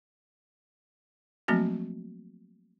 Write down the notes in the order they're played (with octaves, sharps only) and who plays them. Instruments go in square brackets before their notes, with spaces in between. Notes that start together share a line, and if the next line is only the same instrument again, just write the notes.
[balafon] F3 F#3 A3 A#3 C4 F#4